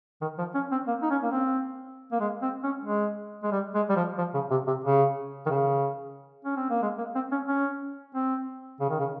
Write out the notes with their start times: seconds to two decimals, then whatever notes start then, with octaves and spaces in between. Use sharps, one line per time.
0.21 D#3
0.38 F3
0.55 C#4
0.72 C4
0.87 A#3
1.02 D#4
1.10 C#4
1.23 A#3
1.31 C4
2.12 A#3
2.20 G#3
2.42 C4
2.63 C#4
2.85 G#3
3.43 G#3
3.52 G3
3.75 G#3
3.89 G3
3.96 F3
4.18 F3
4.34 C#3
4.51 C3
4.67 C3
4.85 C#3
5.46 D#3
5.50 C#3
6.45 C#4
6.57 C4
6.70 A#3
6.82 G#3
6.98 A#3
7.15 C4
7.32 C#4
7.48 C#4
8.15 C4
8.80 C#3
8.90 D#3
8.99 C#3